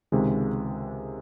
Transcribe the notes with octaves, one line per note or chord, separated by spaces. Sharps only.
C#2 C3 D#3 G#3